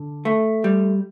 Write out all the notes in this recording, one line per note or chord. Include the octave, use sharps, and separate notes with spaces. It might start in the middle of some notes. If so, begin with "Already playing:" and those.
Already playing: D3
A3
G3